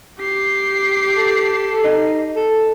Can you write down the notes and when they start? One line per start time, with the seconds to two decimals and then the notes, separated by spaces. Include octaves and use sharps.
0.19 G4 C7
1.17 A4
1.84 D#4
2.36 A4